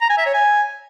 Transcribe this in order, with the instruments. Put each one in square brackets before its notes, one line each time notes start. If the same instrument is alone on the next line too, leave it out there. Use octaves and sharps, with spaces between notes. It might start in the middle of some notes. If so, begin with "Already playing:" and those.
[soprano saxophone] A#5
G#5
E5
C#5
G#5